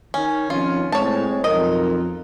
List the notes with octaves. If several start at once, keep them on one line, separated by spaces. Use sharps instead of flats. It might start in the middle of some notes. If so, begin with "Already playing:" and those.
D#3 C#4
F2 B2 D#3 C#4 F4
A2 G#3 C4 C#5 A5
B1 F2 A#4 D#5